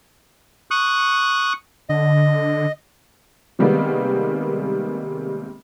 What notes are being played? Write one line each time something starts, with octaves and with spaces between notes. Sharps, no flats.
C#6 D#6 F#6
D3 D#5
C3 D#3 G3 G#3 A#3 B3